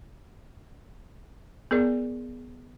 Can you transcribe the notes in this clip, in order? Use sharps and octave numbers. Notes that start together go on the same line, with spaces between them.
B3 G#4 A#4 D5